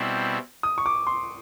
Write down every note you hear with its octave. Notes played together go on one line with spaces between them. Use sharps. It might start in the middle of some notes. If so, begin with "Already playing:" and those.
Already playing: B2 G3 C4 E4
D#6
C#6
D6
C6